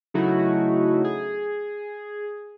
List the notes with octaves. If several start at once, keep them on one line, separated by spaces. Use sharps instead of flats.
C#3 F#3 A3 D#4 E4 F#4
G#4